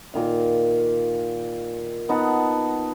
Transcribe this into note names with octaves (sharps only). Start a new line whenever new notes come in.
A#2 D#3 F5
B3 D#4 F#5 A5